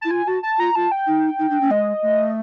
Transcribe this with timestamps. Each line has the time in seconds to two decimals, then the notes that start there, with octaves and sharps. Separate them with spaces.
0.01 E4 A5
0.11 F4 G#5
0.27 F#4 A5
0.43 A5
0.59 F4 A#5
0.75 F4 A5
0.92 G5
1.07 D#4
1.39 D#4
1.50 D4
1.61 C#4
1.70 G#3 D#5
2.03 A3